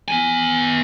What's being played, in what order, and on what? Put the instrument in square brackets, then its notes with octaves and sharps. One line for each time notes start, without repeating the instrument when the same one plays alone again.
[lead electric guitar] B3 G#5